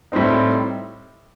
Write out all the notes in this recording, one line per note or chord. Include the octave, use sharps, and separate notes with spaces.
A2 G3 C4 D#4